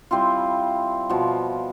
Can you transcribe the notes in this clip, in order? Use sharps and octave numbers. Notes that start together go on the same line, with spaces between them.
G3 C4 E4 F4
B2 F3